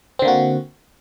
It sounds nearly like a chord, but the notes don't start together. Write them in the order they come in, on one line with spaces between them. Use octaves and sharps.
C4 D3 A#3 F#4